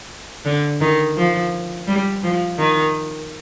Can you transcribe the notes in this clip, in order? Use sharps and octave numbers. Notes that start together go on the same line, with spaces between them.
D3
D#3
F3
G3
F3
D#3